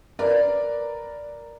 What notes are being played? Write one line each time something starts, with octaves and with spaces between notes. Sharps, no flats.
A#4 B4 D5